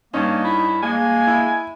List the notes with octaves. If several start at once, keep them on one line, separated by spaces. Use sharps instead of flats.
G2 A#3 C#4 D#4
E4
G#3 A#3 G#5
E4